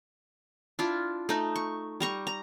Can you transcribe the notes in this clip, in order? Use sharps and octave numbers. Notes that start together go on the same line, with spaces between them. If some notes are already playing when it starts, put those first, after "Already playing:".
D4 E4 F4
A3 D#4
C#6
G3 A#5 C#6
A#5